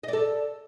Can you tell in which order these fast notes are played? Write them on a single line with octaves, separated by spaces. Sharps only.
D#5 D5 A4